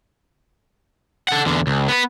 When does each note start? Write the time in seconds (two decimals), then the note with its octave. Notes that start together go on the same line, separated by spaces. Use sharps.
1.28 A4 F#5
1.46 E2 D3
1.67 C#2
1.88 B3 B4